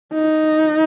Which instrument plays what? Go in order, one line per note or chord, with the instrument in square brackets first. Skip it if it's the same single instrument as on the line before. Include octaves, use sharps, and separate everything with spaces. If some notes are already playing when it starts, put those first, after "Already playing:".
[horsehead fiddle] D#4